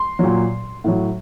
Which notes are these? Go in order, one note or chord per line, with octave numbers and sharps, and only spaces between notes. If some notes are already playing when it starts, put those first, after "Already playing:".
Already playing: C6
A#2 F#3
A2 F#3